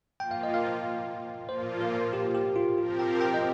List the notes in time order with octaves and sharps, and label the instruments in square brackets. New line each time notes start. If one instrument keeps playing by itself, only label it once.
[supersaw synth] F3 A#3 F4 [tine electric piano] G5
[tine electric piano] F5
D#5
F5
[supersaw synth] A#2 F3 A#3 F4 [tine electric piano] C5
[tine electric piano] A#4
G4
G4
F4
[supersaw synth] F3 C4 G4 A#4 [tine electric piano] F4
[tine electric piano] G5
G5
D#5